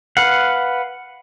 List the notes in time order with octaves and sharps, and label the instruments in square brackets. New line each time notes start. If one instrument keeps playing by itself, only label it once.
[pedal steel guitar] B4 F5 F#5